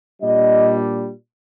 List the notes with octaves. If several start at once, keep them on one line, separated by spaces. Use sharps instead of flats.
A#2 G3 D4 D#5